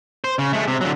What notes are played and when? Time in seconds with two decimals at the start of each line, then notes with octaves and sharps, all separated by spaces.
0.24 C5
0.39 C#3
0.53 G#3 A3
0.68 C3
0.81 D3 F#3